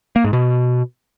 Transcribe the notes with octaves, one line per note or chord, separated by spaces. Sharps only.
A#3
G#2
B2